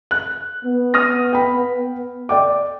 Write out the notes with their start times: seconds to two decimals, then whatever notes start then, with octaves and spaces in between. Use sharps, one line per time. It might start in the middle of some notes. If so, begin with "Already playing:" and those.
0.11 F#6
0.64 B3
0.94 D#6 F6 A#6
1.33 G5 B5
2.29 D5 G5 D6